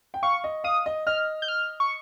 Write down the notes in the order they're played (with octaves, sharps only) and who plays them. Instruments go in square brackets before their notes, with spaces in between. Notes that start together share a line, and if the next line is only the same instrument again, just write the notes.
[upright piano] G5
[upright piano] F5 [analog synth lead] C#6
[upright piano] D#5
[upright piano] F5 [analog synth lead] D#6
[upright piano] D#5
[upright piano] D#5 [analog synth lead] F6
[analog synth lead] G6
F6
C#6